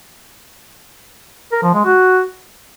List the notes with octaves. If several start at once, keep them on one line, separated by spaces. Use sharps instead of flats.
A#4
F3
G#3
F#4